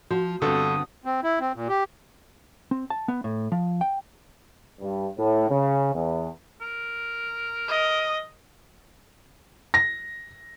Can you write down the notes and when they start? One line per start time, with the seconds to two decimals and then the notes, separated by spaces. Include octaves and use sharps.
0.11 F3 F#4
0.42 G2 D3 B3 C4 A4 D#6
1.05 C4
1.24 E4
1.40 C4
1.55 A#2
1.68 G4
2.71 C4
2.90 A5
3.08 B3
3.24 A2
3.52 F3
3.81 G5
4.81 G2
5.18 A2
5.49 C#3
5.94 E2
6.61 A#4
7.69 D#5
9.74 A#6